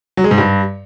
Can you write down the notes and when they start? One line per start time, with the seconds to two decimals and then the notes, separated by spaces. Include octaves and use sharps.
0.17 F#3
0.24 G#3
0.31 G#2
0.38 G2